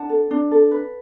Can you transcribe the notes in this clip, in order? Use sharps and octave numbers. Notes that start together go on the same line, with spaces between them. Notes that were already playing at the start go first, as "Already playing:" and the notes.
Already playing: D4 F#5 A5
A4
D4
A4
B4